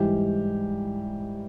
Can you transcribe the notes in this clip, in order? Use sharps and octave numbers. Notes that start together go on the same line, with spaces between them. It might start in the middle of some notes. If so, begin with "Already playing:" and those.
Already playing: G#2 E3 G3 G4